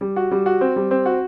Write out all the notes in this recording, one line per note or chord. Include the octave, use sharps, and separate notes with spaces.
G3
F#4
G3
F#4
C4
G3
C4
F#4